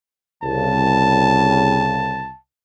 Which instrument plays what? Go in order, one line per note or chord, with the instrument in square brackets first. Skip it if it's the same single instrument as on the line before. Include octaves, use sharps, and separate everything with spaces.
[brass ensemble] C2 C#3 [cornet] A5